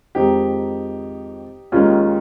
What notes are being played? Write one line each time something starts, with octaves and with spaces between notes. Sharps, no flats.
F2 D#3 G#3 D#4 G4
D#2 D#3 G#3 C#4 F4